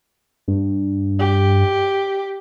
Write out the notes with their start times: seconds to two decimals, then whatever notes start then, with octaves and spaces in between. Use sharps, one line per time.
0.48 G2
1.19 G4